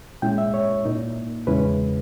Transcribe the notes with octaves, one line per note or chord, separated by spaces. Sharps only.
A#2 G#3 C#4 E4 G5
E5
C#5
A#2 A#3 D#4
E2 C#3 G#3 C#4 E4 B4